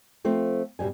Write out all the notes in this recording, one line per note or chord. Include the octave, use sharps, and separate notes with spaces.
F3 A3 C4 F4
F#2 B2 G3 G#3 G#5